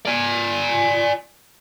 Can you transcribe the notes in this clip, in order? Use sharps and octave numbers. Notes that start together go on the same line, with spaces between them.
D5 G#5